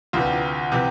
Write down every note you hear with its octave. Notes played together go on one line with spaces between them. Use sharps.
D2 C3 E3 F4
C3 E3